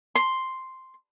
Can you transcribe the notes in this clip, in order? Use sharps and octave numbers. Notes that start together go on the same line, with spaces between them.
C6